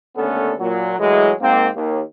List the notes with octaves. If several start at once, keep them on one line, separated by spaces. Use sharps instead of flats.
D#2 D3 A3 B3 C#4 A4
A#2 F#3
A2 E3 F#3 G#3
G#2 A#3 C4
D#2